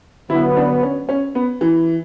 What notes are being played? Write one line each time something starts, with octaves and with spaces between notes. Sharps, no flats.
D3 F#3 B3 E4
D4
C#4
C#4
B3
E3